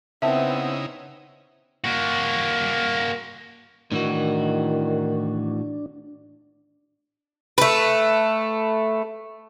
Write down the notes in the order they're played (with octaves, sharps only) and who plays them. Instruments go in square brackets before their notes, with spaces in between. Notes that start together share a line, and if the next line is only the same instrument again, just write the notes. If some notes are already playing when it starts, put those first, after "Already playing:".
[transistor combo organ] C#3 D#4 E4 [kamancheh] B3 C4 [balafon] E5 A5
[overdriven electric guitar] A#3 F#4
[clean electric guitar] A2 E3 F#4 [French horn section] D#3 [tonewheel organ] D4
[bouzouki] A3 B4